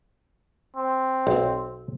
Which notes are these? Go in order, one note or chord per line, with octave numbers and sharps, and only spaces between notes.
C4
B1